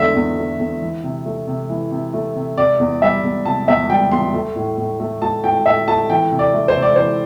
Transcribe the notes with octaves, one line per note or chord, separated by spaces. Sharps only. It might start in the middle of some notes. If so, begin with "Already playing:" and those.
Already playing: E2 D3 A3 E5
E2
A3
E2
E3
C3
A3
C3
E3
C3
A3
C3
C3 D5
E2
G3 E5
E2
C3 A5
E2 E5
G3 G5
E2 C6
A3
A2
A2
A3
A3 A5
A2 G5
A2 E5
A3 A5
E3 G5
C3
D5
A3
C5
C3
D5
E3 C5